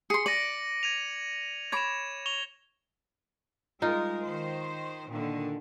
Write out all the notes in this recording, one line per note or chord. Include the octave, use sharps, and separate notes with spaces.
G#4 C6 C#7
D5 A#6 D#7 F#7
G#6 D#7 F7
C#5 B5 D6 G#6 E7
C#6 F7 G7
G3 G#3 D#4 F4 A#4
D#3 C5
A#2 D3 D#3